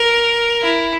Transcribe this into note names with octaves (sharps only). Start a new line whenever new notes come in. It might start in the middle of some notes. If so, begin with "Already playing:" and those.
Already playing: A#4
E4